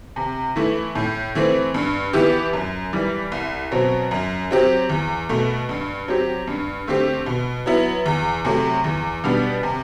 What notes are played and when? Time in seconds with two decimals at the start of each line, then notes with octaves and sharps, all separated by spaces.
0.16 C3
0.56 E3 A3 E4
0.95 A2
1.35 E3 A3 C4
1.74 G2
2.13 E3 B3 E4 G4
2.53 F#2
2.93 E3 G3
3.32 C2
3.71 B2 F#3 C4
4.11 F#2
4.51 F#3 C4 G4
4.89 E2
5.29 B2 A3
5.69 G2
6.08 F#3 C4 G4
6.47 G2
6.87 D3 A3 C4 G4
7.26 B2
7.66 F#3 B3 E4
8.06 E2
8.45 C3 F#3 A3
8.84 E2
9.24 B2 G3 B3 D4
9.63 C3